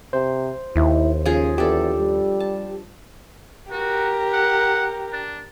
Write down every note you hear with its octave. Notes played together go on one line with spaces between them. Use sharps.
C3 C5
D#2 E4
C#3 F3 G#4
E2 D4 G4 A4
G3
A5
F#4 G4 A#4
F#5
D4